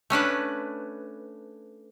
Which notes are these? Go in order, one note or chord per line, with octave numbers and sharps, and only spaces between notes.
A3 C#4 D4 B4